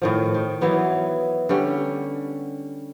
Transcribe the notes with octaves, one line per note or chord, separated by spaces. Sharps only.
A2 D#3 F3
D#3
E3 F#3 B3 D#4
D3 G3 C#4